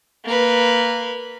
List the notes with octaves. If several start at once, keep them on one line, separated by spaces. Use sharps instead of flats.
A#3 B4